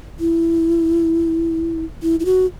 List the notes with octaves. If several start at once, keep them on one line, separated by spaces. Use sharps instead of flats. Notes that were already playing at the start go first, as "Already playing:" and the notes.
E4
E4
E4
F#4